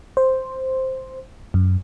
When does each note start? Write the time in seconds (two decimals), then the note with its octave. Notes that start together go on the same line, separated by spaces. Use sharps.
0.17 C5
1.54 F#2